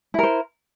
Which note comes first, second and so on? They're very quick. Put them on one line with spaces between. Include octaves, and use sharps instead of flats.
E4 A#4 C5